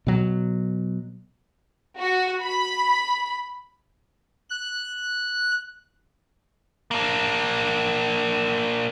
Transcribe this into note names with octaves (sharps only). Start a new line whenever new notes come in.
B2 F#3
F#4
B5
F#6
A#3 D4